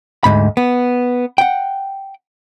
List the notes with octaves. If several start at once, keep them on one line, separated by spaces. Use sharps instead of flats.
D2 G#2 B5
B3
F#5 G5